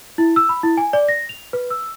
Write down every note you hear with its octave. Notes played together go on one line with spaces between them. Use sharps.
E4
E6
B5
E4
G#5
D5
A#6
F7
B4
E6